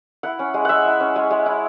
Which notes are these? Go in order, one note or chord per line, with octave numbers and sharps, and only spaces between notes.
E4 F#5
C#4
G#3
G#3 E5 F#5
E4
C#4
G#3
G#3
E4